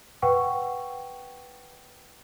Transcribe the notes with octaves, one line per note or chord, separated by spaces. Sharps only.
B4 F#5 G5 C#6